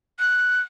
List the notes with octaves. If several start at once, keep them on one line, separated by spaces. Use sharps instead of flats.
F#6